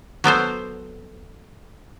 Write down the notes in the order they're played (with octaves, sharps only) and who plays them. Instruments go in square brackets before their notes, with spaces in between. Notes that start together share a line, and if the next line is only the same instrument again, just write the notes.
[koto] F#3 B3 A4 C5